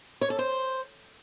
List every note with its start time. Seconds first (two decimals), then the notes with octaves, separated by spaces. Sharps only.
0.21 C#5
0.30 A4
0.39 C5